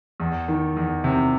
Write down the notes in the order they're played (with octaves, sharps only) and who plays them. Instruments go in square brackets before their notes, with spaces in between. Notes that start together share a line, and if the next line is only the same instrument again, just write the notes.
[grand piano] E2
D#3
E2
C3